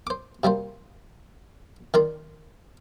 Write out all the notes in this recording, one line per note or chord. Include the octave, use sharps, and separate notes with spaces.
C5 D6
C3 G3 A#3 C5
D#3 A#4 D5 C6